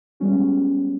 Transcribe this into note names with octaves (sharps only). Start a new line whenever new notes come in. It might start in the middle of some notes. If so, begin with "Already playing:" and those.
G3 G#3 B3 C#4 F#4